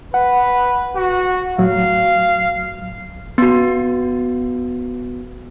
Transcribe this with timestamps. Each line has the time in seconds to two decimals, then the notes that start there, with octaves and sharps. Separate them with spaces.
0.14 B4 F#5
0.96 F#4
1.58 A2 F#3 F5
3.38 B3 F#4